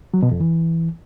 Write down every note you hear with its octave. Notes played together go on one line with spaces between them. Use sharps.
F#3
B2
F2
E3